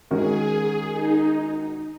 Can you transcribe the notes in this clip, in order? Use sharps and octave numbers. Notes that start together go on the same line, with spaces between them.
D#3 G#3 C#4 F#4 G#4 A#4
D#4